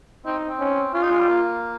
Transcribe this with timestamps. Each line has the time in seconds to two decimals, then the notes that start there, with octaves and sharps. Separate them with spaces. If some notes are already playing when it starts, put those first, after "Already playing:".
0.25 C4 D#4
0.48 C4
0.60 C#4
0.94 C#4 F4
1.02 D#4
1.11 G#3
1.19 G3
1.28 A#3